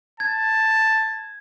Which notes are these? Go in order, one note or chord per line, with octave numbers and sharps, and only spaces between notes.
A5 G#6